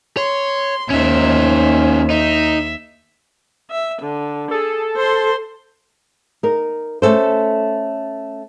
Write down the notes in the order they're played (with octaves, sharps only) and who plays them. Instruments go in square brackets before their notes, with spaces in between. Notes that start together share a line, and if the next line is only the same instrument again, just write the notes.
[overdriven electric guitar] C#5 [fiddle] C6
[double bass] D#2 [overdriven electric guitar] C#4 D#4 [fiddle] C5 E5
[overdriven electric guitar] D#4 [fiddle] E5
[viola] E5
D3
[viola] G#4 [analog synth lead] A4
[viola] C5 C6
[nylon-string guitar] D#4 A#4
A3 C#4 A4 C5